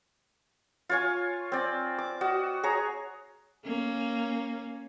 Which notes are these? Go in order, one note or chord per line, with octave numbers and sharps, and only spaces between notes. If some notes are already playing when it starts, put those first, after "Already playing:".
F4 C#5 G#5
C4 D5
D6
F#4 D#5
G#4 C#5 A#5
A#3 C#4